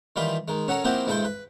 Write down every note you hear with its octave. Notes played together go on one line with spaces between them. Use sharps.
D#3 E3 G3 F4 B5
D#3 G#3
C#4 F#4 A4 A#4 C#5
F3 A#3 C4 E4 F#4 G4
G2 G#3 E4 A4 C5 G5
B4